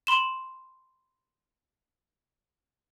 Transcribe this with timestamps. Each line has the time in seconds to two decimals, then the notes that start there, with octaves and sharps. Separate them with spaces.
0.07 B5 C6 E7